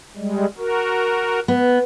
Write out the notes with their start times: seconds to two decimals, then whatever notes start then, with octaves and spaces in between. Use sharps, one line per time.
0.16 G3 G#3
0.58 F#4 A#4
1.48 B3